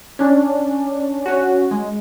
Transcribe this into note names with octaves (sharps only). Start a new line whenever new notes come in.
C#4 D4
C#4 F#4
G#3